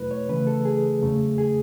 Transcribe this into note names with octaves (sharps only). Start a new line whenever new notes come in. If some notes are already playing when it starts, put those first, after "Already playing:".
Already playing: E2 B2 F#3 A3 E4 B4
C#5
C#3 E3 A3 B4
A4
G#4
E2 C#3 F#3 A3
G#4